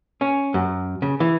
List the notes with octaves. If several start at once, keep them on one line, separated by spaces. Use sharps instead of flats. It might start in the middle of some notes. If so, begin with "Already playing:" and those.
C#4
F#2
C#3
E3